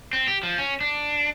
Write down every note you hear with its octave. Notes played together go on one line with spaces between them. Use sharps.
C4
G4
F3
C#4
D4